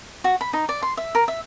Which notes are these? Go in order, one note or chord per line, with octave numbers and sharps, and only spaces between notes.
F#4
B5
D#4
D5
C6
E5
A#4
E5